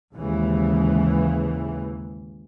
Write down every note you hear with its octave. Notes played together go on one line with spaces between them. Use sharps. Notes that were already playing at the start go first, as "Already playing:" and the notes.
D#2 G#2 C#3 E3